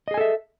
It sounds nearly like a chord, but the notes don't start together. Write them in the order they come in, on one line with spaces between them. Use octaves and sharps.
D#5 G#4 G#5 A4 E5